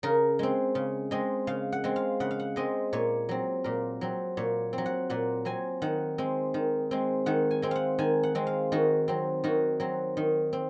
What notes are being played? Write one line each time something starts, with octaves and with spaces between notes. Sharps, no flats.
C#3 A#4
G#3 C4
C#3
G#3 C4 D#5
C#3 F5
F#5
G#3 C4
F5
C#3 F#5
F5
F#5
G#3 C4 D#5
A#2 C#5
F#3 C4
A#2 A#4
F#3 C4
A#2 C#5
C4
F#3
F#5
A#2 F#5
F#3 C4 G#5
D#3 F#5
G#3 C4
D#3
G#3 C4
D#3 F#5
G#5
G#3 C4
F5 F#5
D#3 G#5
F#5
G#3 C4
F5
D#3 F#4
F#3 C4
D#3 F#4
F#3 C4
D#3
C4